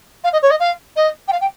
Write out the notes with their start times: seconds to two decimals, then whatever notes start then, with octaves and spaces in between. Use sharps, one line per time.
0.23 F5
0.32 D#5
0.42 C#5
0.50 D#5
0.59 F5
0.96 D#5
1.27 G5
1.32 F5
1.40 G5